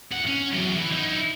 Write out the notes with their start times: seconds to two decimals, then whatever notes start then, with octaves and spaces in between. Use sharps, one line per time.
0.12 E2 F#5
0.27 C#4
0.52 E2 F#3
0.77 E3 E4
0.92 D#4 E4